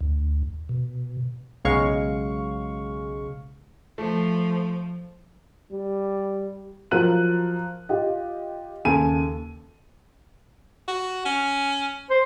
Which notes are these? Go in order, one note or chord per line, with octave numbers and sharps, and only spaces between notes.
D2
B2
B1 C#3 F#3 G#3 F5 C#6
F3 A3
G3
F3 F#3 A#4 F5 F#6 D#7
F4 G4 D#5
D#2 C#3 A4 G#5 D#7
F#4
C#4
C5